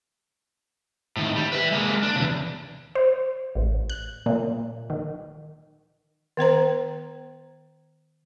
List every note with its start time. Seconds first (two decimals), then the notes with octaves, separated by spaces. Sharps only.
1.17 A2 D#3
1.36 G3
1.53 B4 E5
1.72 G#3 A#3
2.03 D4
2.16 E2 C#3
2.95 C5
3.55 A1
3.90 F#6
4.26 A#2
4.90 D#3
6.37 D#3 B3 C5 A#5